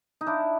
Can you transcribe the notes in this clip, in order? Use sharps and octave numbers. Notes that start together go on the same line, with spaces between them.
D#4
D4 E4